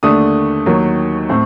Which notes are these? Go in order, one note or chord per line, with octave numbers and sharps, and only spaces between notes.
D#2 D3 A3 D4 D#6
D#2 D#3 F#3
A2 A3 C4